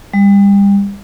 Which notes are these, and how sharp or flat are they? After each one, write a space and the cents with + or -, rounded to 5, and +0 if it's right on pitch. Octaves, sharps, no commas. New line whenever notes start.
G3 +30